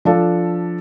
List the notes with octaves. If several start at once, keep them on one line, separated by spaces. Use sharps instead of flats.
F3 D4 A4